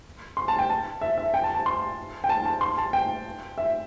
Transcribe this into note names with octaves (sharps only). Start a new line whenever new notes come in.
C6
A5
G5
A5
E5
E5
G5
A5
A5
C6
G5
A5
A5
C6
A5
G5
E5